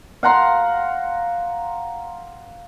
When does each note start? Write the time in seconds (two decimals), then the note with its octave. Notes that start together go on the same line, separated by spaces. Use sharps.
0.23 F5 F#5 A#5 C6